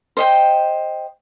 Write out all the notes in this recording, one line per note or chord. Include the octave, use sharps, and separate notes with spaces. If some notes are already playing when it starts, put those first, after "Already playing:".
C5 D#5 G5